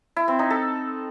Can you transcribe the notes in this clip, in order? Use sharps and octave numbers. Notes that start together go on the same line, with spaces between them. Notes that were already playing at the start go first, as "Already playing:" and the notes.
E4
C4
D#4
A4